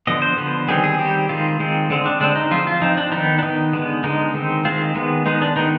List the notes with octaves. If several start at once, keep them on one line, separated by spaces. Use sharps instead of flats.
D3 F3 B3 D#5
C5
D3 F3 B3
D#3 G3 C4 G#4
G#4
D#3 G3 C4 G4
D#3 G#3 C4 F4
D#3 G#3 C4
D3 G#3 C4
D4
D3 G#3 C4 D4
D#4
F3 C4 F4
F4
F3 C4 D#4
D4
D#3 B3 D#4
D4
D#3 B3 D#4
D3 G#3 B3
D3 G#3 B3 D#4
D#3 G#3 C4
D#3 G#3 C4 F4
D#3 G#3 B3
D#3 G#3 B3 D#4
D4
D#3 B3 D#4